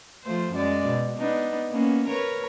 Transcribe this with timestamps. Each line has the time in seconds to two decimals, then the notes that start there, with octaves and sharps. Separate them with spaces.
0.24 F3 A3 C5
0.52 F#2 G#3 D5
0.86 B2
1.18 B3 D4 D#4
1.70 A#3 B3 C#4
2.08 A#4 B4 C#5